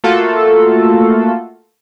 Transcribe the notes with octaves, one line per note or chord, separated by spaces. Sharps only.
A3 A#3 F4 F#4 A4